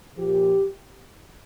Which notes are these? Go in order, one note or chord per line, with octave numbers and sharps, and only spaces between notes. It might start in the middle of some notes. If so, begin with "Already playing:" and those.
A#2 F3 G4